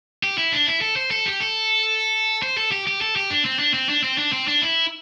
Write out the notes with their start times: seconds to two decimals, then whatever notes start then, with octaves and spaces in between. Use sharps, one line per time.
0.23 G4
0.38 E4
0.52 D4
0.67 E4
0.82 A4
0.96 C5
1.11 A4
1.26 G4
1.40 A4
2.43 C5
2.57 A4
2.72 G4
2.87 G4
3.01 A4
3.16 G4
3.30 D4
3.45 C4
3.59 D4
3.74 C4
3.89 D4
4.04 C4
4.18 D4
4.33 C4
4.48 D4
4.62 E4